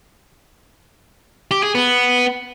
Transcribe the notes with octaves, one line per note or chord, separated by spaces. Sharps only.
G4
G#4
B3